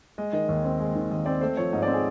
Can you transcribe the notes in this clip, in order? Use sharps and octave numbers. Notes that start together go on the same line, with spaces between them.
G#3 D#5
D#3 D#5
D#2
C4
G#3
D#3
D#2 D#5
C4 D5
A3 C5
F3 C#5
G#2 D#5
D5
C4
G#4